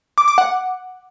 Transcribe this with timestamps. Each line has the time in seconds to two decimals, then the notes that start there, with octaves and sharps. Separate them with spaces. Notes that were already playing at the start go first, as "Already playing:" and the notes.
0.18 D6
0.28 D6
0.38 F#5